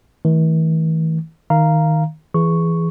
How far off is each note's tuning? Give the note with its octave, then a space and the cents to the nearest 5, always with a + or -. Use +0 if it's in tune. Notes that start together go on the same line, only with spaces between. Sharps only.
E3 -45 A3 +0
D#3 +0 F5 -10 A#5 +0
E3 +15 G#4 +0 C#6 +0